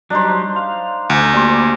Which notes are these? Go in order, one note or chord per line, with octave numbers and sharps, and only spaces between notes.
F#3 G3 D4 D#4 C5
F5
D2
G3 A#3 C5 D6